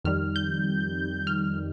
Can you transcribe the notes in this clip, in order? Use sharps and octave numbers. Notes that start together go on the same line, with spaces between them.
F2 D#3 G3 F6
G6
F6